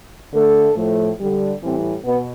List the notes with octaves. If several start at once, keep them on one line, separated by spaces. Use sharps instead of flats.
D3 A3 A4
A2 F3 A3
D3 G3
A2 E3 G3 C4
B2 B3